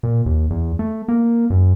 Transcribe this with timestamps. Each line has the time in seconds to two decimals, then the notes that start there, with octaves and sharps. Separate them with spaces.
0.03 A#2
0.26 D#2
0.50 E2
0.79 A3
1.08 A#3
1.50 F#2